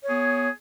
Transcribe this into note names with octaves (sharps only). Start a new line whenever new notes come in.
B3 G#4 C#5